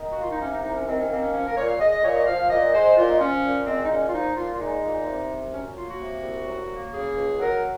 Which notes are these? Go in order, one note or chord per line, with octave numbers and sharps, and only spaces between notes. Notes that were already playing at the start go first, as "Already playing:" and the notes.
Already playing: D#3 D#4
F#4
A#3 F4
D#4
C3 C#4
D#4
C2 D#4
C#4
D#3 C4
C#4
A#3 C4
C#4
F3 C#4
A#4
A#2 C#5
F5
G#3 D#5
D#5
A#2 C#5
D#5
F3 F5
A#2 D#5
G#3 C5
A#2 F4
D#4
F3 C#4
A#2
G#3 C4
D#4
A#2 C#4
F4
F3 D#4
A#2 F4
F4
G#3 D#4
A#2
C3
C2
F#3 C#4
A#3 F4
F#4
C3
C2
F#3
A#3
C#3 G#4
C#2
F#3 A#4